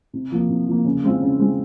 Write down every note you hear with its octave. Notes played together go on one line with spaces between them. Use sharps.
C3
F3 A#3
C3
F3 A#3
C#3
G#3 C4 F4
C#3
G#3 C4 F4